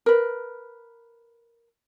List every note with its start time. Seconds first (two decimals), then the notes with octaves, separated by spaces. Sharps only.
0.06 A#4 B4